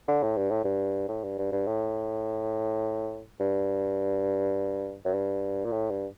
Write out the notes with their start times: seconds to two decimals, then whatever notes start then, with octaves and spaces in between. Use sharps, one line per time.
0.08 D3
0.23 A2
0.37 G2
0.51 A2
0.64 G2
1.08 A2
1.24 G2
1.38 G2
1.52 G2
1.67 A2
3.40 G2
5.05 F#2
5.14 G2
5.65 A#2
5.72 A2
5.90 G2